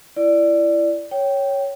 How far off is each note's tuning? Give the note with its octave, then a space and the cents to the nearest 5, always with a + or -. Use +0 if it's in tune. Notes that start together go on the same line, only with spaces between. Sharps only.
E4 +25 D5 +0
C#5 +0 G5 -10